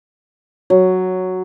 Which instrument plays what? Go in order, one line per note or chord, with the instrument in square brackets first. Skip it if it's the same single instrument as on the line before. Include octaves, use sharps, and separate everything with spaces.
[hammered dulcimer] F#3